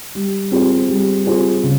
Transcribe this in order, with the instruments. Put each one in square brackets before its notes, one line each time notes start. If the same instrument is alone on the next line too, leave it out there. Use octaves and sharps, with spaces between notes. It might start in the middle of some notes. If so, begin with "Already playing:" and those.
[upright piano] G3
C4 F4 G#4 C5
G3
C4 F4 G#4 C5
C#3